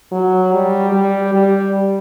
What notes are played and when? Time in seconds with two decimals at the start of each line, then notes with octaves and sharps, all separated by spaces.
0.12 F#3
0.53 G3
0.93 G3
1.33 G3